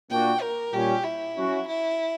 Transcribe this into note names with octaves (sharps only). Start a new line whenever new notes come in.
A#2 A#3 D4 F#4 G5
A#4
A#2 G3 C#4 G4
E4
F#3 C#4 F#4
E4